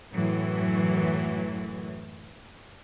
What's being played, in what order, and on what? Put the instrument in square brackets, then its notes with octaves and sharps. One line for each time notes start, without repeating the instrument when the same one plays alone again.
[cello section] F#2 A2 E3 F#3